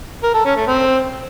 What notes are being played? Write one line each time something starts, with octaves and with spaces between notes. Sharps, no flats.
A#4
A4
C#4
A3
C4